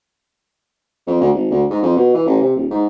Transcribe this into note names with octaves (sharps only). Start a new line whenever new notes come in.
F2
D2
G#1
D2
G#2
F2
B2
E3
A1
C3
D#1
G#2